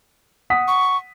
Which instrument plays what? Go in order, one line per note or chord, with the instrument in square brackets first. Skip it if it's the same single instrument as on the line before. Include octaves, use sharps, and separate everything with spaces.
[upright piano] F#5 D#6 B6
[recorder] C#6